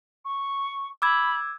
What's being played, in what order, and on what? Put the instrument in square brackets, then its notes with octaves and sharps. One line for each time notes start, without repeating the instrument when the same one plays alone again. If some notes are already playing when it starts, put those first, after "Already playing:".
[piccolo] C#6
[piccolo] B5 [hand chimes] D6 E6 G#6